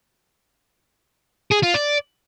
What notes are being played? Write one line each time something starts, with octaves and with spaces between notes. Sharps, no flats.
G#4
F4
D5